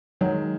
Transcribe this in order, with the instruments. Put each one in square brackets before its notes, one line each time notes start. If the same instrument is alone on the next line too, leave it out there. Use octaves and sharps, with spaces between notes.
[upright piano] D#3 G#3 [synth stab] F#3